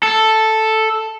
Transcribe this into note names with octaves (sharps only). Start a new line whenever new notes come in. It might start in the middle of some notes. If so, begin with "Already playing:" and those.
A4